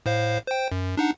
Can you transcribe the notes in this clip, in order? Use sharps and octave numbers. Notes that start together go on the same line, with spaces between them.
A2 C5 F5
C5 G5
F#2
D4 D#4 F#5